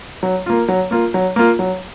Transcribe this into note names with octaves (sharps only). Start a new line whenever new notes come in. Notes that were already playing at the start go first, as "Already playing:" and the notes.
F#3
A#3 F4
F#3
A#3 F4
F#3
A#3 F4
F#3